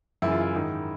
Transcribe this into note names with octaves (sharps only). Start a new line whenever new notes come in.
F#2 C#3 E3 E4
F4
E4
G#2 D#3